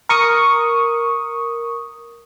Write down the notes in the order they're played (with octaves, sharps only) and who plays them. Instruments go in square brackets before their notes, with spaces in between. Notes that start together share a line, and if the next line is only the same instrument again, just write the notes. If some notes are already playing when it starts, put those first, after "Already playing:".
[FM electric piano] A#4 C#6 D#6